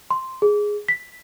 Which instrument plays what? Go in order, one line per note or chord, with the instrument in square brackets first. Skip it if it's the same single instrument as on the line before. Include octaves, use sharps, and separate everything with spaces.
[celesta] C6
G#4
B6